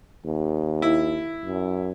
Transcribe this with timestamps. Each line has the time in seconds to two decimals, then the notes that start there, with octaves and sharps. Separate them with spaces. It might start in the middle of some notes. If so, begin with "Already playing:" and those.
0.25 D#2
0.82 E4
1.45 F#2